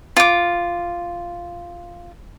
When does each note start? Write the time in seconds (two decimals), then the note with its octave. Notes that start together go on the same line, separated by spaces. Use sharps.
0.17 F4 D6